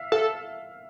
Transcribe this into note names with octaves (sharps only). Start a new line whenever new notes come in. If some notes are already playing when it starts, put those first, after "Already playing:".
Already playing: E5 F5
A4 F5